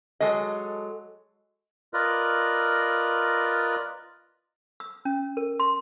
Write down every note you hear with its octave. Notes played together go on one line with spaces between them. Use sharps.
F#3 G#3 A4 D#5
F4 A#4 B4 D5 D#5
E6
C#4
A#4
C6